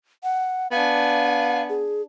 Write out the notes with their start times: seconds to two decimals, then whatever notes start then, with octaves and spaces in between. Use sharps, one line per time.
0.23 F#5
0.72 B3 D4 F5 G#5
1.69 G#4